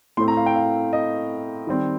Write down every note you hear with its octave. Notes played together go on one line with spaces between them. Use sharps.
A2 A3 C4 C6
A#5
F5
G5
F5
D#5
D#3 G3 C4